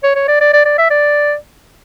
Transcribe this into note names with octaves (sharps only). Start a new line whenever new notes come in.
C#5
C#5
D5
D5
D5
D5
E5
D5